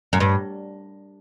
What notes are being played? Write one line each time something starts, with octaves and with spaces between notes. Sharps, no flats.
F#2
G2